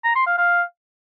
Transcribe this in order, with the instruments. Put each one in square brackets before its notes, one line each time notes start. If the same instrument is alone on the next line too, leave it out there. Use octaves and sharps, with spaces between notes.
[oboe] A#5
C6
F5
F5